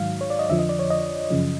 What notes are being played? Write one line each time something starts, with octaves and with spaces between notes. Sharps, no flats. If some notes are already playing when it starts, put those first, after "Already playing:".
Already playing: G#2 D#3 F#3 F5
C#5
D5
D#5
F2 D3 F3 E5
D#5
D5
C#5
D#5
F#2 C#3 F3